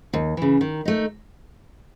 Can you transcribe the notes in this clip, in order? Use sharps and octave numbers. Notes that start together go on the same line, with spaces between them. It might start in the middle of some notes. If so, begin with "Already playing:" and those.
D#2
C#3 E3
D#3
A3 D#4